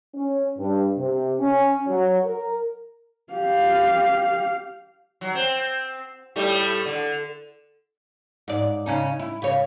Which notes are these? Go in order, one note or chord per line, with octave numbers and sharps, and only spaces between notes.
C#4
G2
C3
C#4
F#3
A#4
G4 F5
F#3
C4
A2 G3 A3
D3
G#2 D5
C#3 C#4 D#4
E4
C#3 C#5